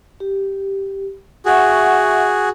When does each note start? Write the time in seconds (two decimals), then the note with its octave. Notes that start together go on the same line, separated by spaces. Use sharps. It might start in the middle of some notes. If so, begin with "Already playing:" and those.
0.20 G4
1.46 F#4 G#4 E5 F#5 C#6